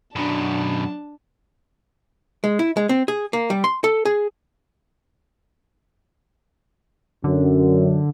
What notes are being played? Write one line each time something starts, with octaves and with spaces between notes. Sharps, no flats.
F#2 B2 D4 A5
G#3
E4
G#3
C4
G#4
A#3
G3
C6
A4
G#4
F#2 D3